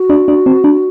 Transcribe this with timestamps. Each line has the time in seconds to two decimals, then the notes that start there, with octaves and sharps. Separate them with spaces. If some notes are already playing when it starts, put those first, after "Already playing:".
Already playing: F#4
0.10 D4
0.28 D4
0.46 C4
0.64 D4